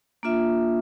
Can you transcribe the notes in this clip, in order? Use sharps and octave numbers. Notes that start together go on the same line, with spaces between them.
A#3 D4 F4 E5